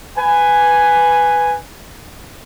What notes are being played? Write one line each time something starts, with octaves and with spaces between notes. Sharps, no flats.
B4 G#5